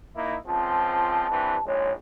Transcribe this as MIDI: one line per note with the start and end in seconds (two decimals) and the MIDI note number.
0.17 0.37 58
0.17 0.37 63
0.17 0.37 64
0.47 1.31 37
0.47 1.31 53
0.47 1.31 60
0.47 1.67 81
1.31 1.58 43
1.31 1.58 52
1.31 1.58 60
1.67 1.94 34
1.67 1.94 44
1.67 1.94 56
1.67 1.92 73